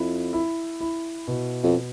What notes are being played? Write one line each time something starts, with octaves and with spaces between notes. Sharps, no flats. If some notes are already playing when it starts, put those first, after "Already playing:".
Already playing: F2 E4
E4
E4
B2
F2